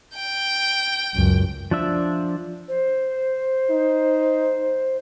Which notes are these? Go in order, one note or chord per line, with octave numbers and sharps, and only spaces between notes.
G5
C#2 F#2
F3 D4 E5
C5
D#4